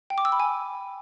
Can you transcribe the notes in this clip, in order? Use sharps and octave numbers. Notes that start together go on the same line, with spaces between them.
G5
D6
E6
B5
G#5